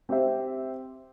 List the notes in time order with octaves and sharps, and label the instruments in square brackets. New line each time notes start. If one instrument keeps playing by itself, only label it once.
[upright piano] C4 G4 C5 E5